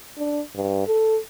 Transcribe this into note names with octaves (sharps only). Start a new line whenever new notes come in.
D4
G2
A4